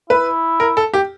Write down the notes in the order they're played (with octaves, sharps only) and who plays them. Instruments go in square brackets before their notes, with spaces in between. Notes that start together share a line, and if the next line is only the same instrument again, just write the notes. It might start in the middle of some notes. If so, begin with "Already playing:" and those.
[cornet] E4 [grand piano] B4
[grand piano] A#4
A4
G4